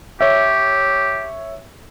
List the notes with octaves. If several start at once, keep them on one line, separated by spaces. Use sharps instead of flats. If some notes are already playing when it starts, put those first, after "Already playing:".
G4 C#5 E5